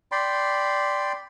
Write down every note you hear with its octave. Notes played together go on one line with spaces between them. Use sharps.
D5 G5 B5 C6